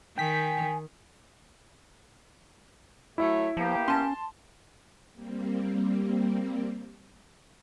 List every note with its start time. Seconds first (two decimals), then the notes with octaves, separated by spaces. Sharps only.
0.18 D#3 G5 G#5 B6
3.18 F#3 A3 E4 C#5 E5
3.57 F3 A#3 B3 G4
3.88 C#4 A5 C6
5.14 G3 A#3 C4